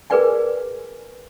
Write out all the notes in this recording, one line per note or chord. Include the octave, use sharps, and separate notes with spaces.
G#4 A#4 B4 D5 G5 G#5